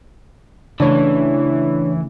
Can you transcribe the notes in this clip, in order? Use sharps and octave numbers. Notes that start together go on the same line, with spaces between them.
C#3 E3 A3 D4 C#5